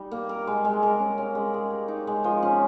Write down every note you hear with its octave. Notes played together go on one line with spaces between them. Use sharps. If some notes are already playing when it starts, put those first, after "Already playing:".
Already playing: G3 D#4
A#3
A#4
G#3
G#3
A#4
C#4
C#4
G#3
G#4
G4
D#4
G#3
F3
C#4